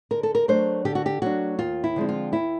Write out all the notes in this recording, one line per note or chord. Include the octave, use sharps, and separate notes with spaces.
D3 A#4
A4
A#4
F#3 A3 D4 C5
D3 G4
F#4
G4
F#3 A3 D4 F#4
D#2 F4
E4
D3 F3 G#3 C4
F4
D#2 E4